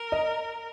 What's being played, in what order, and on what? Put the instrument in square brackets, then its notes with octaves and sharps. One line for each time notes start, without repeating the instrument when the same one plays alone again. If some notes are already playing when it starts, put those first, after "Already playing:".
Already playing: [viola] A#4
[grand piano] D#5